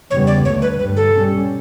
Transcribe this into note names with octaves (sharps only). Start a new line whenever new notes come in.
E2 C#3 G3 B3 C#5
D5
D2 D3 A3 C#5
B4
G2 D3 G3 B4
A4
B2 G3 C#4